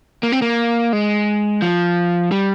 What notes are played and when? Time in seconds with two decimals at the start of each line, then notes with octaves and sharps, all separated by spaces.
0.23 A#3
0.32 C4
0.42 A#3
0.93 G#3
1.62 F3
2.32 G3